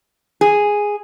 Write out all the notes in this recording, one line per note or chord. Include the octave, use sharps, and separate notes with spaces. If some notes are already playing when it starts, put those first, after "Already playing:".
G#4